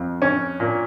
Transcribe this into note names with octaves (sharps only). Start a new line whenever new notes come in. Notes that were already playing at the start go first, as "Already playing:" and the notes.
Already playing: F2
C#4
A#2